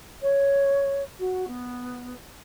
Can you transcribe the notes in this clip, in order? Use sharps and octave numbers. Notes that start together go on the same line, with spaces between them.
C#5
F#4
B3